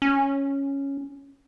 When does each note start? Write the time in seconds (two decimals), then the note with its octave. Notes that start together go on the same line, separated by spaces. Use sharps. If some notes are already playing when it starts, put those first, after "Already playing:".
0.02 C#4